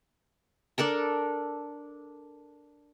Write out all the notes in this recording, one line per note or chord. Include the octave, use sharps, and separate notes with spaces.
D4 A4 A#4 A5